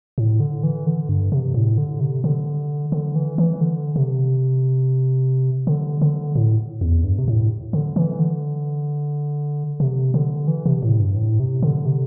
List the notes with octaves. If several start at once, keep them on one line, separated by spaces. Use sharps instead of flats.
A2
D3
E3
D3
G2
C3
A2
D3
C3
D3
D3
E3
E3
D3
C3
D3
D3
A2
E2
G2
C3
A2
D3
E3
D3
C3
D3
E3
C3
A2
G2
A2
C3
D3
C3